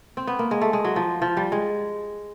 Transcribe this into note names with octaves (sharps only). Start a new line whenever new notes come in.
C4
B3
A#3
G#3
A3
G#3
F#3
F3
F3
G3
G#3